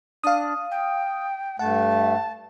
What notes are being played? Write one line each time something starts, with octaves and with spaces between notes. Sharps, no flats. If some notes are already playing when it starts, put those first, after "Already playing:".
D4 F5 D#6
G5
G2 A3 F#5 A5